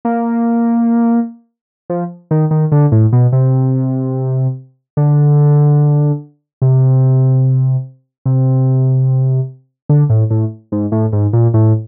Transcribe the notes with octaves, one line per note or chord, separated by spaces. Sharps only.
A#3
F3
D#3
D#3
D3
A2
B2
C3
D3
C3
C3
D3
A2
A2
G#2
A2
G#2
A#2
A2